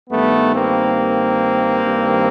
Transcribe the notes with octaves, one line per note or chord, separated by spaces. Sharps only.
G2 D#3 A3 B3
A#3 C4
G2 D#3